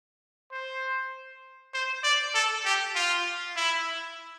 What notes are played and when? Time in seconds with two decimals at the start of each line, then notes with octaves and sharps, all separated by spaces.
0.52 C5
1.74 C5
2.04 D5
2.35 A4
2.65 G4
2.95 F4
3.56 E4